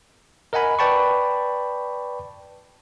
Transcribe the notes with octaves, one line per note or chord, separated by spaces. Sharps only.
A#4 D#5 F#5 G#5 B5
B4 D5 G5 A5 B5 C#6